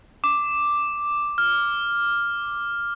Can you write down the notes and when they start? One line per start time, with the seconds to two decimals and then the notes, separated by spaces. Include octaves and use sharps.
0.24 D6
1.38 F6